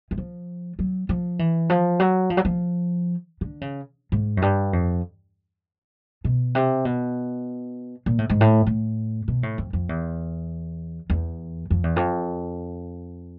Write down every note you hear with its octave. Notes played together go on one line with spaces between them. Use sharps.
E3
F3
F#3
F3
E3
F3
F#3
F3
F#3
F3
D3
C#3
G#2
F#2
G2
F2
B2
C3
B2
A#2
A2
G#2
A2
A2
B2
A2
F2
F2
E2
E2
F2
E2
F2